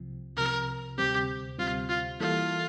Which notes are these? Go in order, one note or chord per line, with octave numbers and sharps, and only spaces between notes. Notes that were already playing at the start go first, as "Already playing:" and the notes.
Already playing: C2 C3 F3
C2 C3 F3 A#4
D2 C3 G3 C4 G4
D2 C3 G3 C4 F4
F4
E3 G3 A#3 E4 F4 A4